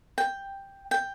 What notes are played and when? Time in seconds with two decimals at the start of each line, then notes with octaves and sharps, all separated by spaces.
0.18 G5
0.91 G5